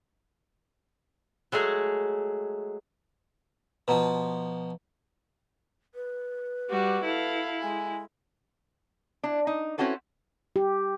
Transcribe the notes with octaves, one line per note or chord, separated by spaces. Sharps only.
F#3 G#3 A3 G#4
B2 F3 B4 A#5
B4
G3 F#4 D6
E4 A4 F5
G#3 G#5
D4 E4
D#4
C4 C#4 E4 F#4 A4 B4
G4